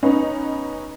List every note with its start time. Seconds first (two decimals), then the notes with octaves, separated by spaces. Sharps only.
0.03 B3 C#4 D#4